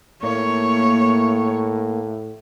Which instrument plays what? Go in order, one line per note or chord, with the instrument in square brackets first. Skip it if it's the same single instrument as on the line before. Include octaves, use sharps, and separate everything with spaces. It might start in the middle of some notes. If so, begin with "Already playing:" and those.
[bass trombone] A2 [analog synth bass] A#3 [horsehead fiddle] C#5